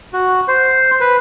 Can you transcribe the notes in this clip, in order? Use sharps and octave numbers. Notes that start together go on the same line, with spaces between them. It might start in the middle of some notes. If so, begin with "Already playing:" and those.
F#4
C5
B4